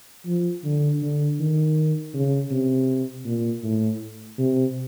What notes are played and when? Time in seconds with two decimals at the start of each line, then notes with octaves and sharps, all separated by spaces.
0.26 F3
0.64 D3
1.02 D3
1.40 D#3
2.14 C#3
2.51 C3
3.25 A#2
3.63 A2
4.38 C3